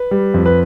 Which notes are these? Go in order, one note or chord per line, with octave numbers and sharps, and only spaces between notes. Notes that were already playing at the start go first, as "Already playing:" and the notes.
Already playing: B4
G3
F2
B4